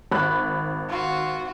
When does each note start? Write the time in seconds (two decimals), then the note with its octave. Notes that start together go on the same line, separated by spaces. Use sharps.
0.12 G#1 B5 F#6
0.89 F4 F#4